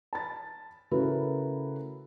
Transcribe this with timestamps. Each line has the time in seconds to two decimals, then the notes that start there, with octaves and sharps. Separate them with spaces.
0.13 A5 B5 A6
0.91 C#3 A3 E4 F#4 A#4 B4